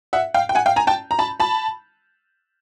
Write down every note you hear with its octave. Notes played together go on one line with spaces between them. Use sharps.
E5 F#5
F5 G5
G5
F#5 G#5
F5 G5
G#5 A#5
G5 A5
A#5
A5 B5
A5 B5